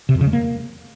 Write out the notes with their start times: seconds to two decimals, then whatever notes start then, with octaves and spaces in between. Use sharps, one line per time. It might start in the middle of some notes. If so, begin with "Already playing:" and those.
0.09 C3
0.15 F2
0.21 C#3
0.27 G#3
0.33 A#3